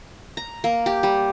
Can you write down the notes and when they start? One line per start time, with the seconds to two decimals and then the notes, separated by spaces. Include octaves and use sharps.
0.37 A#5
0.64 A#3
0.86 G4
1.03 G3